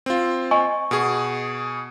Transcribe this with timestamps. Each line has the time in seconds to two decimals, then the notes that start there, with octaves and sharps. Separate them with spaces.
0.06 C4 F4
0.51 D#5 G#5 C#6
0.91 B2 G#4